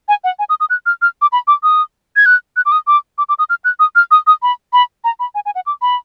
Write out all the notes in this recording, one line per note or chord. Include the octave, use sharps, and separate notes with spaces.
G#5
F#5
G#5
D#6
D#6
F#6
F6
F6
D6
B5
D6
D#6
G#6
F#6
F#6
D6
D#6
D6
D6
D6
D#6
F6
F#6
D#6
F6
D#6
D#6
B5
B5
A#5
B5
G#5
G#5
F#5
D6
B5